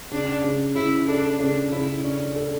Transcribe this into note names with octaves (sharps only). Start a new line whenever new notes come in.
C#3 D4
C#3
C#3 E4
D4 A4
C#3 D4
C#3 E4
C#4 D4
A4